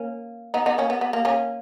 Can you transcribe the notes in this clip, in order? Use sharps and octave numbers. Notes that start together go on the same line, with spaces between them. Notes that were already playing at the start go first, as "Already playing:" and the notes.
Already playing: A#3 C#4
B3 D#4
B3 D#4
A#3 C#4
B3
B3
A#3
A#3 C#4